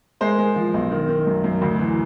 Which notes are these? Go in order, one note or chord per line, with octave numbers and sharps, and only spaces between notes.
G#3 A#4 C5
G#3
F3
B1
D#3
D#3
F#2
F#2
D2
E3